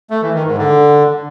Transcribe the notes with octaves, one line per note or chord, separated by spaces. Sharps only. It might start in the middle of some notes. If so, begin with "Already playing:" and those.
A3
E3
D#3
G#2
D3